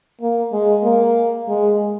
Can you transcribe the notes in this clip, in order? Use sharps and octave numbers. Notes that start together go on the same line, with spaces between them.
A#3
G#3
A#3
G#3